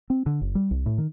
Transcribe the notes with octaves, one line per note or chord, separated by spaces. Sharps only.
C4
D3
F#1
G3
C2
A2
D#3